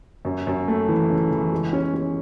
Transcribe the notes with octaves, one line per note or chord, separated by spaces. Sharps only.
F#2
F#2
A3
E3
C#3
E3
G#3
C#4
C#4